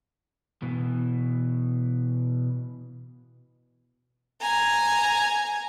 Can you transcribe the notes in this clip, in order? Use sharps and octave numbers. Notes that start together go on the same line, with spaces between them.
B2 E3
G#5 A#5